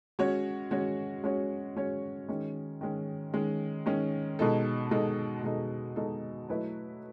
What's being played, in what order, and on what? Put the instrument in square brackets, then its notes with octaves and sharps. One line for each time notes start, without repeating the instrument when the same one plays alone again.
[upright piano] G#3 C#4 F#4 C#5
G#3 C#4 F#4 C#5
G#3 C#4 F#4 C#5
G#3 C#4 F#4 C#5
D#3 G#3 C#4
D#3 G#3 C#4
D#3 G#3 C#4
D#3 G#3 C#4
B2 G#3 D#4 A4
B2 G#3 D#4 A4
B2 G#3 D#4 A4
B2 G#3 D#4 A4
F#3 A3 E4 B4 D#5